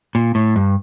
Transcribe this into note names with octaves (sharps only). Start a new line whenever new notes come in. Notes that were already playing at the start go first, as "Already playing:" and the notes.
A#2
A2
G2